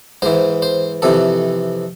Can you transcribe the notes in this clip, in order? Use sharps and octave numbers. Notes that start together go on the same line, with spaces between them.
G#2 E3 C5
C5
F2 C3 E3 A4